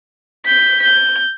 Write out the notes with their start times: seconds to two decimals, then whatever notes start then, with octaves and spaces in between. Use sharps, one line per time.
0.45 G6 B6
0.83 G6